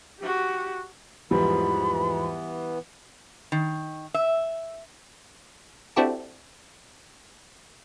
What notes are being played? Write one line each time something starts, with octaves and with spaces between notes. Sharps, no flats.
F#4 G4
E2 G#2 E3 F3 G3 B3 B5
D#3
E5
C4 D4 E4 F#4 G4 A4